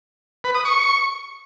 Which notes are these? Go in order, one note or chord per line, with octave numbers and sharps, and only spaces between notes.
B4
D#6
C#6